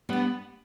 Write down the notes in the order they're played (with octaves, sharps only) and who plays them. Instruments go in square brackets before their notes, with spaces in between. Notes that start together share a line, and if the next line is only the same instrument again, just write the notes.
[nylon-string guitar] G3 D4 [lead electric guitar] B3